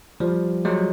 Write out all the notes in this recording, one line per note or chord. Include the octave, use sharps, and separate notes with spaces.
F3 G3
F#3 G#3